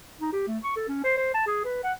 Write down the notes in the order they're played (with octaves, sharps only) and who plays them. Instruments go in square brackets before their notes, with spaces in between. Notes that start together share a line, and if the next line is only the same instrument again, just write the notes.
[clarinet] D#4
G4
A3
C#6
A4
C#4
C5
C5
A5
G#4
B4
F#5